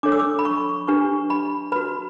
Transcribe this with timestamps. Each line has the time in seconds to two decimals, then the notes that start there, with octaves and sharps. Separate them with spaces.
0.03 D4 A4 C#5 D6
0.12 E6
0.19 D6
0.39 B5
0.45 C#6
0.88 D4 G4 B4 C#6
1.30 B5
1.72 F#4 B4 B5